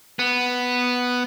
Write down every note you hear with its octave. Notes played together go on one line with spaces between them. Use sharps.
B3